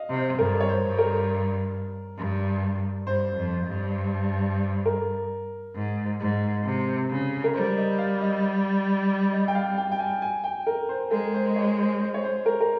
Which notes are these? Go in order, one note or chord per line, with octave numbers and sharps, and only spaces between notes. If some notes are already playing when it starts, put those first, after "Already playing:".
Already playing: D#5 F5
C3
C5
G2 A#4
C#5
C5
G2
A#4
G2
G2 C5
F2
G2
A#4
G#2
G#2
C3
C#3
A#4
G3 C5
D#5
F5
D#5
D#5
G5
F5
G5
G5
G#5
G#5
G5
A#4
C5
G#3 A#4
C5
D#5
C#5
C5
C5
C#5
C5
A#4
A#4